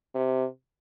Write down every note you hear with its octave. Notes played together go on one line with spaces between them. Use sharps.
C3